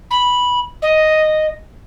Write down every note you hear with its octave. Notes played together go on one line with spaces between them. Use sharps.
B5
D#5